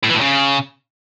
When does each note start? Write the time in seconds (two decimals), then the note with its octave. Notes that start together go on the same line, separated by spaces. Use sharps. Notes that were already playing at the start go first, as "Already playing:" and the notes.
0.04 A2
0.10 E3
0.15 A2
0.21 C#3